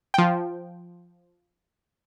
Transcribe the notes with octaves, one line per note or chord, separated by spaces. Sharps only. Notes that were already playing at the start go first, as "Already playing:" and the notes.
F3 G5